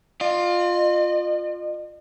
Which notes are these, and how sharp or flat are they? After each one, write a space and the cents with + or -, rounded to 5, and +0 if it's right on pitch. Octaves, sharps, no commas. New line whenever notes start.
F4 +10 D#5 -45